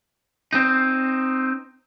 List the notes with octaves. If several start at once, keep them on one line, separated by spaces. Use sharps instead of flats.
C4 D#4